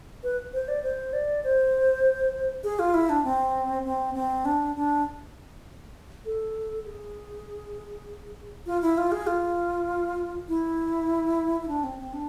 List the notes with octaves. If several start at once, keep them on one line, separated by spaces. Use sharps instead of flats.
B4
C5
D5
C5
D5
C5
G#4
F4
E4
D4
C4
C4
C4
D4
D4
A4
G#4
F4
E4
F4
G#4
F4
E4
E4
D4
C4
C4
D4